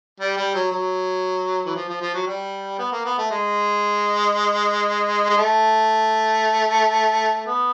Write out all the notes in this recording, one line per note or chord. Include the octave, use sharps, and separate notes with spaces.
G3
G3
F#3
F#3
E3
F3
F3
F3
F#3
G3
B3
A#3
B3
A3
G#3
G#3
A3
B3